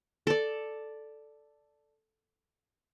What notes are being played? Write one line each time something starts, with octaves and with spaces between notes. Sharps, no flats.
A4 D5